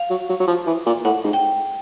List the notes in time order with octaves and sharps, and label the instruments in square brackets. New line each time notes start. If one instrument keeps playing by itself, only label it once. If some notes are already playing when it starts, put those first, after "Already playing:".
Already playing: [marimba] F5
[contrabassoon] F#3
F#3
F#3
F3
E3
A#2
[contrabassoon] A2 [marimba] F#5
[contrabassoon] G#2
[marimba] G5